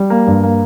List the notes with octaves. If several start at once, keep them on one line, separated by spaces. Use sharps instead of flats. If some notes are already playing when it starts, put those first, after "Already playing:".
Already playing: G3
A#3
G2
A#3